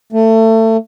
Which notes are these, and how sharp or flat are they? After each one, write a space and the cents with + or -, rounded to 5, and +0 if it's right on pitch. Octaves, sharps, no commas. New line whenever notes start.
A3 +25